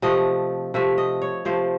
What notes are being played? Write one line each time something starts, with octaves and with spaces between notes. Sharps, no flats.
C3 F3 A3 D#5
C3 F3 A3 E5
D#5
C#5
C3 F3 A3 C5